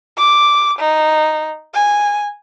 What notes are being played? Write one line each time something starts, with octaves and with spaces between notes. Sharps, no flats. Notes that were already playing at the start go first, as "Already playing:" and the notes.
D6
D#4
G#5